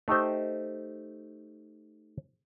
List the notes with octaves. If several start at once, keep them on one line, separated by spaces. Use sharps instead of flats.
A3 D#4 G4 C5